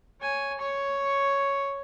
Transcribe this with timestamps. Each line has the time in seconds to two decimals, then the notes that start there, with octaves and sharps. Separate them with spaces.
0.21 C#5 G#5
0.58 C#5 C#6